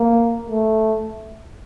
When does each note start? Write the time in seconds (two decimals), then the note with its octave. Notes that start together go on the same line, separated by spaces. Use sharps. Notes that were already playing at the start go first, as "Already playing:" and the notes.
Already playing: A#3
0.50 A3